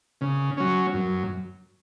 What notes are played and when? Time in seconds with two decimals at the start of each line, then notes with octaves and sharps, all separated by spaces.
0.21 C#3
0.57 F#3 C#4
0.94 F#2